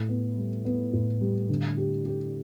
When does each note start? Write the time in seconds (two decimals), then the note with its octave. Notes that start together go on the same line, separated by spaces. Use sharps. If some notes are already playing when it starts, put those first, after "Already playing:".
Already playing: A2
0.09 B3
0.37 G3
0.65 B3
0.93 A2
1.21 G3
1.49 D3
1.77 G4
2.05 G4